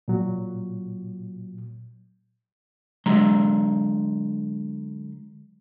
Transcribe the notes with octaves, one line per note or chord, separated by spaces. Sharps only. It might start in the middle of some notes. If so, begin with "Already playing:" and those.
A#2 F#3
D3 F#3 G#3 A#5 C6